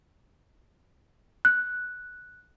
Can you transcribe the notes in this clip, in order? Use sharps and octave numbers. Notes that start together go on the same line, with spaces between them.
F#6